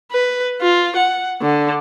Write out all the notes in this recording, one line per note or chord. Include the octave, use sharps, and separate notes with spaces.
B4
F4
F#5
D3